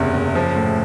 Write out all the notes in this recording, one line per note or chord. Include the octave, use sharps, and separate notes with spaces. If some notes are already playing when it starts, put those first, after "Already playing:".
Already playing: F#1 E2 C3
F#1
F3
A2